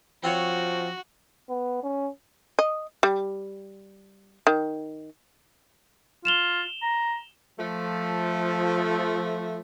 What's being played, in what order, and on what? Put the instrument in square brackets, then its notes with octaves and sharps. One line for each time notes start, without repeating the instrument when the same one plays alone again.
[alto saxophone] F3 [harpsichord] C4 F4 C#5 [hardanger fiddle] F#4
[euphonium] B3
C#4
[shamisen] D#5
G3
D#3
[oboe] F4 [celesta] E7 F7 G7
[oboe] A#5
[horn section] F3 A3